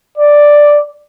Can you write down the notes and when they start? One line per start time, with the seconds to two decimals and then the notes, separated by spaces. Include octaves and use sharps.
0.18 D5